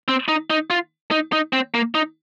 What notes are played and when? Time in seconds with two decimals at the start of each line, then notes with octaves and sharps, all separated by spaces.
0.08 C4
0.28 D#4
0.50 D#4
0.70 F4
1.11 D#4
1.33 D#4
1.53 C4
1.74 A#3
1.95 D#4